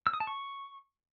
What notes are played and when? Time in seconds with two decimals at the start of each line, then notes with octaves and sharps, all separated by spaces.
0.07 E6
0.13 D#6
0.20 A5
0.27 C#6